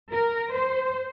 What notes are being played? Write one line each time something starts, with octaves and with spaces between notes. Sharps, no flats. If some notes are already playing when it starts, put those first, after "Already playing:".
A#4
C5